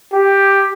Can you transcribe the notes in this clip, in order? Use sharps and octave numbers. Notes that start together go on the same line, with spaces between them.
G4